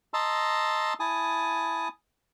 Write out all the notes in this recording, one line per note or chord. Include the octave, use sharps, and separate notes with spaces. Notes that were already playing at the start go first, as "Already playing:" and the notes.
D#5 A5 A#5 C6 E6
E4 G#5 A5 D#6